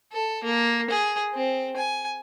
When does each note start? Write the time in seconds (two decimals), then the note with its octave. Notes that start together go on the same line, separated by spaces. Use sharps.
0.13 A4
0.44 A#3
0.90 G#4
1.34 C4
1.76 G#5